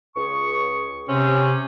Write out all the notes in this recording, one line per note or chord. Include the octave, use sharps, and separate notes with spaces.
C#2 G#4 C#6
C3 C4 C#4